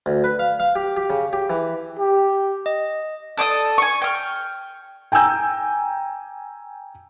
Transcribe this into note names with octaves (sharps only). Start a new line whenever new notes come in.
D2
B4
F5
F5
G4
G4
C#3
G4
E3
G4
D#5
A4 D5 D6 D#6
G#5 C#6
G5 F6
G5 G#5 A#5 E6 G6